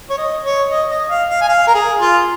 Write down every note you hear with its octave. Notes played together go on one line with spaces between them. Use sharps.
C#5
D#5
C#5
D#5
D#5
F5
F5
G#5
F5
A#4
G#4
F4